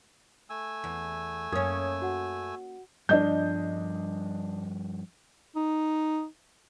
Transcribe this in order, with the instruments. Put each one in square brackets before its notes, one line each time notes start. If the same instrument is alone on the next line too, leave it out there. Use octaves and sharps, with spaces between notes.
[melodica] A3 G#5 E6
[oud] E2
[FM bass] F#2 [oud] A#3 C#4 [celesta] D#6 G#6
[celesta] F#4 F#5
[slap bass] G2 F3 G3 [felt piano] D4 D#5 G6
[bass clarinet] D#4